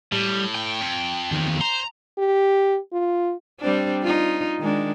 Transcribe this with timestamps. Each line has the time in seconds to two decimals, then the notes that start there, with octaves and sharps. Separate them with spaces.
0.12 A2 G3
0.55 G5
0.81 F2
1.31 E2 D#3
1.61 C5 A#5
2.18 G4
2.93 F4
3.61 G3 C4 D4
4.03 D#4 F4
4.59 D#3 G#3 D4